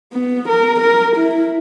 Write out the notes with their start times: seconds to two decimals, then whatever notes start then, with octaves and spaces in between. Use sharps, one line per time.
0.12 B3
0.48 A#4
0.80 A#4
1.16 E4